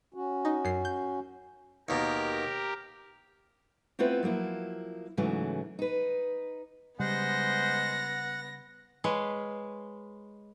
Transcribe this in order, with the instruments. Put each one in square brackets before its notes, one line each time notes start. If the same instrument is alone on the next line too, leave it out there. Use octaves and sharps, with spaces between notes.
[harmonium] C#4 F#4
[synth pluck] D#4
F#2 C7
G6
[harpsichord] D#2 B2 [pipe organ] G4 A#4
[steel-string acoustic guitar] A3 B3 C4 E4 F4 B4
F3 F#3 A#3 E4
G#2 C#3 E3 F#3 A3
D#4 B4
[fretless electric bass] C#3 G3 [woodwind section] G#3 C5 [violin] B3 A#6 [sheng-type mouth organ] F#5
[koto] G#3 B4 C#5 F5